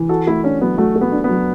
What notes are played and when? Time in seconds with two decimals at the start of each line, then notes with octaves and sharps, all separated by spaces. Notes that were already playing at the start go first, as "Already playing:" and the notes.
Already playing: E3
0.09 F#4 A4
0.27 A3 E4
0.44 C#4 D4
0.61 F#3 B3
0.78 A3 F#4
0.96 A3
1.01 B3
1.12 D4
1.24 B3
1.29 F#3